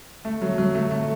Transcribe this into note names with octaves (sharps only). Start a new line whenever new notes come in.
A3
F#3
F#3
A3
A3